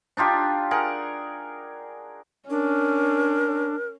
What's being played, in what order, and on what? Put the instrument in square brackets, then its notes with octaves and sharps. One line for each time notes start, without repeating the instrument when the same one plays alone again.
[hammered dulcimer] D4 D#4 F4 G4
G#4 A#4 F#5
[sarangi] C#4 [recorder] D4 [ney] A#4